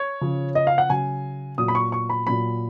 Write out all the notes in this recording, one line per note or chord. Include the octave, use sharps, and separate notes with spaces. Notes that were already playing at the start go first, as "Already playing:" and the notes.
Already playing: C#5
C#3 F3
D#5
F5
F#5
C#3 F#3 G#5
A#2 F#3 D#6
B5
C#6
C#6
B5
A#2 F#3 B5